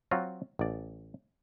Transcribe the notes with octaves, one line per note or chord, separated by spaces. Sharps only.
F#3 C4 F4 F#4
A1 D5